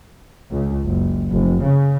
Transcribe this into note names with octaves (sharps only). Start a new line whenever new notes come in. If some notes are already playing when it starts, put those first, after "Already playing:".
C#2
F#1
F1
C#3